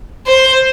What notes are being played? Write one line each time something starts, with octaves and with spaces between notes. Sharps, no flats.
C5